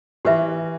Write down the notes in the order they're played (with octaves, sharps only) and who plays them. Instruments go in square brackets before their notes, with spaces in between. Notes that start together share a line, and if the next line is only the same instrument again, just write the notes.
[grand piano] E3 [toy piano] G4 B4 E5